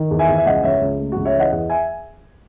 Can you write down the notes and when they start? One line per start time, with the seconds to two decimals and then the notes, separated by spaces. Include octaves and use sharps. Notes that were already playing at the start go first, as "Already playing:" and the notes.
Already playing: D#3
0.11 E2
0.19 E5 G#5
0.28 E2
0.38 E5
0.46 C#2 D#5 F#5
0.63 C#2 C#5 E5
0.81 C#2
0.99 A3
1.12 C#2 F#4
1.25 C#5 E5
1.34 E3 D#5 F#5
1.52 E2 D#5 F#5
1.70 E5 G#5